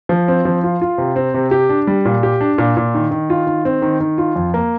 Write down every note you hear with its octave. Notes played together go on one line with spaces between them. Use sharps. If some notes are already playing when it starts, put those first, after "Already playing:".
F3
C4
F3
F4
F4
C3
C4
C3
G4
D4
G3
A#2
G4
D4
A#2
A#2
D#3
D#3
F4
D#3
C4
D#3
D#3
F4
F2
A#3